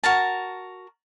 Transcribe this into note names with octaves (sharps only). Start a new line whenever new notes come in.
F#4 A#4 A5